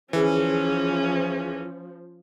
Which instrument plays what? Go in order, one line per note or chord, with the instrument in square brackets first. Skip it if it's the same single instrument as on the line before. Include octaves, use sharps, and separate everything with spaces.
[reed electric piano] D2 G#4 [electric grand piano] E3 [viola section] F3 [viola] C#4